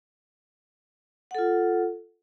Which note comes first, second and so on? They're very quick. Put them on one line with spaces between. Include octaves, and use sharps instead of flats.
F#5 A4 F4